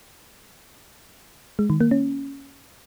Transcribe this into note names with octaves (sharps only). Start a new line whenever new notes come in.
G#3
D#3
A#3
C#4